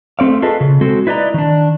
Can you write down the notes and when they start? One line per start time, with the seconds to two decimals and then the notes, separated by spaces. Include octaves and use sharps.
0.19 A3 C4 D5 F5
0.42 F4 G#4 A4 B4 D#5
0.61 C#3
0.81 G#3 C4 F#4 A4
1.07 E4 B4 D5 D#5 A#5
1.34 D#3 D4